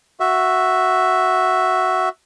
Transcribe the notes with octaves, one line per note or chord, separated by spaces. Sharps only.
F#4 E5